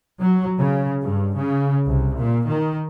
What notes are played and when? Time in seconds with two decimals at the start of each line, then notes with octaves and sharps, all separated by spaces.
0.20 F#3
0.59 C#3
1.03 G2
1.36 C#3
1.86 C2
2.16 A#2
2.50 D#3